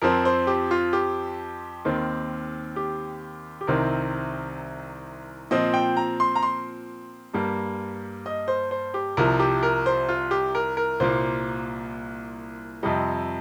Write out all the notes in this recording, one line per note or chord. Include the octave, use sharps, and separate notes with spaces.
F2 F3 C4 A#4
C5
G4
F4
G4
D#2 D#3 C4
G4
G4
C2 C3 D#3 C4 A#4
A#2 F3 C4 D#5
G5
A#5
C6
A#5
C6
G2 G3 A#3
D#5
C5
C5
G4
C2 C3 F3 A#4
G4
A#4
C5
F4
G4
A#4
A#4
C2 A#2 A#3 C5
F2 C3 G3 D#5